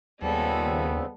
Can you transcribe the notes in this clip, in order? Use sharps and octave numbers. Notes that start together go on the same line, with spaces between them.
D#2 A#2 C#3 G3 G#3 B3 C4 A4